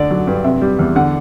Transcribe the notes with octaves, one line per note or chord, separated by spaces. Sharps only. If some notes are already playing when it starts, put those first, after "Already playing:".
Already playing: D2 D3 D5
F#3
G2
C3 E5
G3
E2
D3 F#5